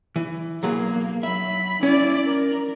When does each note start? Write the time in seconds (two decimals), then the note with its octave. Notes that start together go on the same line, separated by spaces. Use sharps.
0.16 E3
0.63 B1 F#3 A#3 G#4
1.23 F#3 E5 B5
1.83 C#4 E4 D5
2.26 A#4